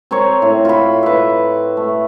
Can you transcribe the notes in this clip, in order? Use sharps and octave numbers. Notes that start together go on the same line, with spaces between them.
C4 A#4 C5 C#5
A2
F4 B5
B4 E5
A3